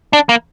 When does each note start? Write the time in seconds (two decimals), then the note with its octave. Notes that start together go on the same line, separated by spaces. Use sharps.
0.13 D4
0.29 A#3